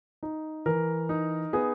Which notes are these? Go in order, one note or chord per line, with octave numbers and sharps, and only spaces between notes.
D#4
E3 A#4
D#4
B3 G#4